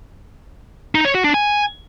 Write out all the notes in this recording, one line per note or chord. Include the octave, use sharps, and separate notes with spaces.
D#4
C#5
F#4
D4
G#5